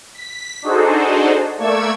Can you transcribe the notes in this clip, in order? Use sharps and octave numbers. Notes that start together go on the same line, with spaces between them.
B6
D4 D#4 F#4 G#4 A4 C5
A3 A#3 D5 C#6 E6 G#6